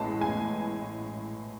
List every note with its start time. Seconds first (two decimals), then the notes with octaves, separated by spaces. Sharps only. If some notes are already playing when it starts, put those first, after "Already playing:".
Already playing: A1 A2 E3 G#3 A5
0.21 G#5